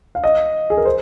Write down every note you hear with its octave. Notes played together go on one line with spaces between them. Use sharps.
F5
D#5
G#4
A#4
C5